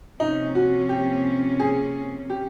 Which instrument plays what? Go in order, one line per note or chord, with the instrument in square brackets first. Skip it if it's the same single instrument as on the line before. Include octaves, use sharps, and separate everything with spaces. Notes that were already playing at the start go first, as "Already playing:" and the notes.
[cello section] C3 F3 A#3 C#4 [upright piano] D#4
[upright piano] F#4
G4
G#4
G4